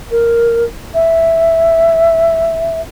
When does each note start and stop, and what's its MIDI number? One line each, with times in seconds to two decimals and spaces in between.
0.11 0.64 70
0.94 2.80 76